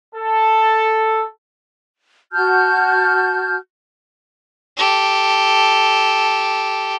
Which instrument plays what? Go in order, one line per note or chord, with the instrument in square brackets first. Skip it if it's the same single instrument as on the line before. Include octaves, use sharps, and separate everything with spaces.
[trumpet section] A4
[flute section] F#4 A5 F6 G6
[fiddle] G4 A4